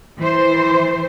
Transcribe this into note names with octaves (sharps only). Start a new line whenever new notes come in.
E3 C5